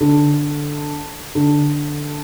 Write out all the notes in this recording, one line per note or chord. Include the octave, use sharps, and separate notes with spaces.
D3
D3